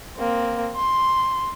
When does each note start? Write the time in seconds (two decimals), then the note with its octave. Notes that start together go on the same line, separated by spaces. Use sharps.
0.17 A#3 C4
0.76 C6